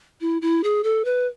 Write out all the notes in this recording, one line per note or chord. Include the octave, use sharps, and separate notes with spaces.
E4
E4
G#4
A4
B4